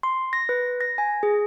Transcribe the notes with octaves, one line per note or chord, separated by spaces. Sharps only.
C6
A#6
B4
A#6
G#5
G#4